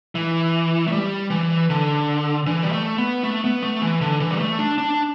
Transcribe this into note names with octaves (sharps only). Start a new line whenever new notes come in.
E3
A3
G3
E3
D3
E3
G3
A3
B3
A3
B3
A3
E3
D3
E3
G3
A3
D4
D4